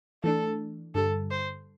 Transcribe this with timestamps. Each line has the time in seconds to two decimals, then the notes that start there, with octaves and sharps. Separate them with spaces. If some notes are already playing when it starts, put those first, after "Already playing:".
0.24 E3 A3 D4 A4
0.95 G2 D3 G3 A4
1.31 C5